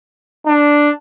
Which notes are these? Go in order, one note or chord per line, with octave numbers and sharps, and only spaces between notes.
D4